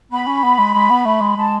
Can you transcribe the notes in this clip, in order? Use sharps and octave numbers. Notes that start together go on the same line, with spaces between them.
B3 B5
C#4
B3
G#3
G#3
B3
A3
G#3
G#3 A5